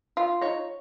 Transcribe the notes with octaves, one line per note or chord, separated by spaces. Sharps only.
F4
D#4 C#5 A#5